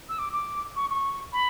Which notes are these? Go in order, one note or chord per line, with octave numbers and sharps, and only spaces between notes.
E6
D6
D6
C#6
C#6
B5